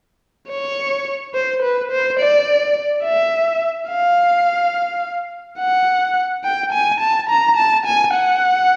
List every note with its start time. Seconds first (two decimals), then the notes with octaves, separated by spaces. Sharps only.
0.49 C#5
1.34 C5
1.62 B4
1.91 C5
2.19 D5
3.04 E5
3.89 F5
5.59 F#5
6.44 G5
6.72 G#5
7.00 A5
7.29 A#5
7.57 A5
7.86 G#5
8.14 F#5